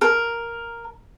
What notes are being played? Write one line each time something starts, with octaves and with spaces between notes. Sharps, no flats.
A#4